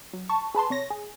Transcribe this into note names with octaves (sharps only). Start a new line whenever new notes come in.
F#3
A5 C#6
G#4 B4 A5 C6
C3 C#5 A#6
G#4